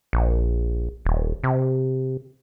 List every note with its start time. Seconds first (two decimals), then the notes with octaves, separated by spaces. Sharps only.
0.13 A#1
1.05 D#1
1.44 C3